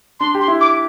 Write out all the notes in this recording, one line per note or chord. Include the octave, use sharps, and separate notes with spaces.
D4 C6
G4
C6
E4
D6